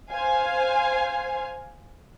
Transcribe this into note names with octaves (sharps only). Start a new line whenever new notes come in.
C5 F5 G#5